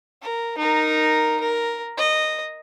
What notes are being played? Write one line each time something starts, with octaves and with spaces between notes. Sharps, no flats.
A#4
D#4 A#4
A#4
D#5